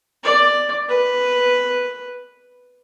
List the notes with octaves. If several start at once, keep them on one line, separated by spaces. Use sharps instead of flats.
D5
B4